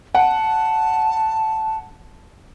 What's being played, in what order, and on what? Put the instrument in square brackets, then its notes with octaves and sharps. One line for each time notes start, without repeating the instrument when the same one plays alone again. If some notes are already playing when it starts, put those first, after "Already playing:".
[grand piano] F#5 [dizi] A5